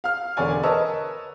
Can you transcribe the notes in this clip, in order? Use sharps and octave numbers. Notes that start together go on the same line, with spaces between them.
F5 F6
E1 D3 C#5 D5 G#5
A#4 B4 C#5 D#5 A5 E6